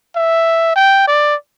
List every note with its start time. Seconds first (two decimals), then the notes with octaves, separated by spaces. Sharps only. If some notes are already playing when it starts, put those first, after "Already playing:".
0.15 E5
0.76 G5
1.07 D5